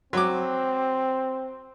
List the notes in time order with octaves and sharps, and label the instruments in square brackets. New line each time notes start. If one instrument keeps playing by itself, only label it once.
[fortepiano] F#3 D6 [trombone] C4